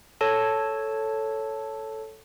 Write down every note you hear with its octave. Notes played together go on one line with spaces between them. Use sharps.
A4 C#5 A5